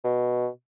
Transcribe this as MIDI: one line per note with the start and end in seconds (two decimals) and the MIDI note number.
0.04 0.48 47